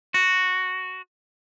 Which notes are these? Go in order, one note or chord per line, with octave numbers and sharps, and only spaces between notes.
F#4